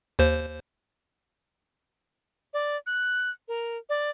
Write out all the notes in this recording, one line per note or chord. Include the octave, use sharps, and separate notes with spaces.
D#2 C5
D5
F#6
A#4
D5